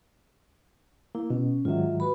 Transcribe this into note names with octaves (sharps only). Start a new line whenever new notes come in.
A#3 E4
B2 C#4
G#2 D#3 F#3 F4 E5
F#4 B4 B5